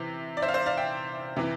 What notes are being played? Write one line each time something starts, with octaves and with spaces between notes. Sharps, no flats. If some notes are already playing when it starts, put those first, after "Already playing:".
Already playing: C3 E3
D5
C5 E5
F5
C5 E5
D5 F5
E5 G5
C3 E3